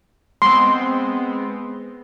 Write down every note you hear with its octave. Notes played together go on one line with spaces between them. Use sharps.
G#3 B3 C4 C6